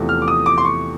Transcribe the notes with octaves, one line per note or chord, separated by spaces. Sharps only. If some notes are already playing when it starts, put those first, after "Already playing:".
Already playing: E2 C3 F3 A3
F6
D6
D#6
D6
C6
C#6